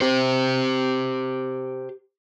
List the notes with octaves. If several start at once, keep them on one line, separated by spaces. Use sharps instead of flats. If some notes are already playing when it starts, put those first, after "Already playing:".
G4 C5